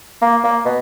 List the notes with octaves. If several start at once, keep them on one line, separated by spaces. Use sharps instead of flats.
A#3
A#3
B2